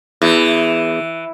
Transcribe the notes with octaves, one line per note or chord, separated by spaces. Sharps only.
E2 E3